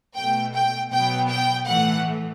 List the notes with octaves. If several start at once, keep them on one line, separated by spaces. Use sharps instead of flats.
B2 A3 G5
G5
B2 F#3 B3 G5
G5
A2 E3 A3 F#5